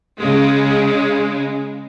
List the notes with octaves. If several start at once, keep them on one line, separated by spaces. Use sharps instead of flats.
C#3 G#3